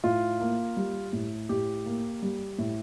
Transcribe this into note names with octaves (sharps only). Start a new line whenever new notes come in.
A2 F4
A#3
G3
A2
A2 G4
A#3
G3
A2